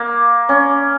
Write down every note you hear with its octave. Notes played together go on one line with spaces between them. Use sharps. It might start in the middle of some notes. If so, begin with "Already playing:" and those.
Already playing: A#3
C#4